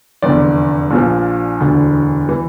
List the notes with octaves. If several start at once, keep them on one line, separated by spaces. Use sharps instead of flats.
F1 E2 D3 D5
A#1 A#2 F3
E1 D2 D3
E3